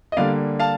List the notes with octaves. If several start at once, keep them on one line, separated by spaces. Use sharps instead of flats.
D#5
D3 G3 A#3 D5 F5
F5 A5